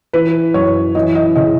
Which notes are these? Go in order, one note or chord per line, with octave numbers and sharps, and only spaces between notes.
E3 B4
F#2 C#5
E3 D#5
D#5
C#3 D#5